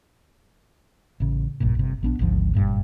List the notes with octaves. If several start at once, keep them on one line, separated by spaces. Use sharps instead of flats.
A1 C#3
F1 A#1 G2 A#2
G1 C3
A#1 B3 D4
G#1 D2 G#2 F3
F#1 G2 A#2